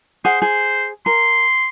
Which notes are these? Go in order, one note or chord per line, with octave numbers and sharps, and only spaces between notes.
G#4 C5 F#5
G#4 C5
A#4 C6